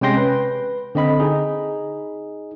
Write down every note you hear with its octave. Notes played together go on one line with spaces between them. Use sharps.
C3 G#3 C#4 G5 C6 A#6
B4
D3 C4 D#5 B5
D#4 G#4